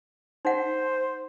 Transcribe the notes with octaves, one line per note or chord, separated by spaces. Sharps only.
D#4 C5 F#5